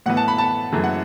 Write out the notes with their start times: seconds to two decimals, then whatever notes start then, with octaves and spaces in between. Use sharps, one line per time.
0.06 A2 E3 B3 F#5
0.17 A5
0.28 B5
0.38 A5
0.72 F#2 C#3 E3 A3
0.84 F#5